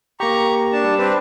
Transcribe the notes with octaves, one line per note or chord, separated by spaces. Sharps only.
A#3 G4 A#5 C#6
D4 A5
G3
C4 D4 B4